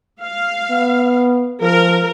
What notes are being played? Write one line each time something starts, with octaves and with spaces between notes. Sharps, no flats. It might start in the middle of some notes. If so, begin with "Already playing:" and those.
F5
B3
F3 A#4